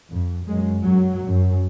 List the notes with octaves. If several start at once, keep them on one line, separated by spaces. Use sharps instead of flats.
F2
F#2 G#3
F#2 F#3
F#2